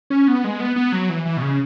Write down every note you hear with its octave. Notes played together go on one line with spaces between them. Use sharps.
C#4
B3
G#3
B3
B3
F#3
E3
E3
B2
C#3